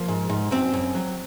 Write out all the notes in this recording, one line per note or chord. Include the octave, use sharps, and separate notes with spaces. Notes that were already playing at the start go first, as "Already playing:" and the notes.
Already playing: F3 A#3
G#2
G#2
F#2 C4
F#2
F#3